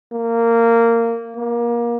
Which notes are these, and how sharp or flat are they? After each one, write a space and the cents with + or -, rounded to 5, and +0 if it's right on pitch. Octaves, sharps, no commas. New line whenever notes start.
A#3 -15
A#3 +25